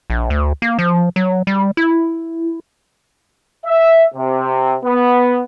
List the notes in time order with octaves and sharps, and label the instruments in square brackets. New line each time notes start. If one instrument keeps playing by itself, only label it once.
[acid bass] A#1
D2
A#3
F3
F#3
G3
E4
[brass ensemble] E5
C3
B3